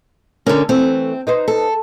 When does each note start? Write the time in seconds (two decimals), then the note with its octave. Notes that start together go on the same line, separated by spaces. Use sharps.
0.46 D3 C#4 A#4
0.69 E3 A3 C4
1.27 D#4 B4 C5
1.48 A4